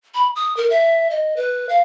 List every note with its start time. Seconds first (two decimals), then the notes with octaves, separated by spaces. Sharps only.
0.15 B5
0.36 D#6
0.57 A#4
0.70 E5
1.10 D#5
1.37 B4
1.69 F5